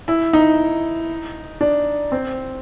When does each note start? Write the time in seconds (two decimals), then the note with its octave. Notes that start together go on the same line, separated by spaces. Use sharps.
0.08 E4
0.33 D#4
1.61 D4
2.12 C4